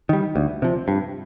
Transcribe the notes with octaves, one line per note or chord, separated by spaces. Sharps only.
D#3 G3
D2
C3 F3
G2